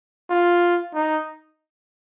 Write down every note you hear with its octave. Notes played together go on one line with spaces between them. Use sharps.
F4
D#4